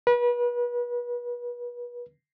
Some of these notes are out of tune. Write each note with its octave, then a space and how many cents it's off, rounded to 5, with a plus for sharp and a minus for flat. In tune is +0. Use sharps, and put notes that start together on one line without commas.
B4 -35